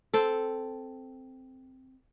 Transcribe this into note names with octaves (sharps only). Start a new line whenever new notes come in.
C4 A4